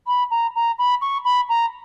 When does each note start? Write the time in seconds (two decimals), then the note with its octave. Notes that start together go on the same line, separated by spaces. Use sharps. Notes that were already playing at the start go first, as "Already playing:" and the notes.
0.07 B5
0.31 A#5
0.55 A#5
0.78 B5
1.01 C#6
1.25 B5
1.49 A#5